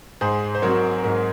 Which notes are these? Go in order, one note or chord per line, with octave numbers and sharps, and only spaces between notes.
G#2 G#4 C5
C5
F#3 C4 A#4 C#5
G#2 A#4